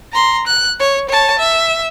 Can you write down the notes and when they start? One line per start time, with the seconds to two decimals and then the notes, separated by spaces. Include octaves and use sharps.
0.12 A#5 C6
0.47 F#6
0.80 C#5
1.09 C#5 A5
1.39 E5